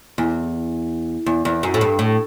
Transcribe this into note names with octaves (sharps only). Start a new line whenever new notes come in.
E2
E2
E2
F#2
A2
G2
A2